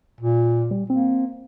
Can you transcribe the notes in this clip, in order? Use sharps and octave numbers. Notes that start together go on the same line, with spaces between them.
A#2
G3
A#3 C4